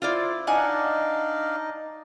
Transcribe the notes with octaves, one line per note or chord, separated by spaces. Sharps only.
E4 F4 C5 D5
D4 D#4 D5 D#5 F5 F#5 G#5